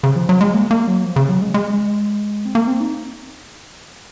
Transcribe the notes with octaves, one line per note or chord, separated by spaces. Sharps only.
C#3
F3
F#3
G#3
A#3
A#3
F#3
F3
C#3
F#3
G#3
G#3
C4
A#3
C4
D#4